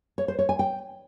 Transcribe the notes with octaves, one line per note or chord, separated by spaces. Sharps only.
C#5
C5
C#5
G#5
G5